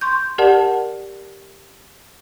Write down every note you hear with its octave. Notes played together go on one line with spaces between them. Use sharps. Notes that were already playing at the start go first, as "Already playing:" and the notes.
C6 C#6 G6
G4 A#4 D5 F#5 A5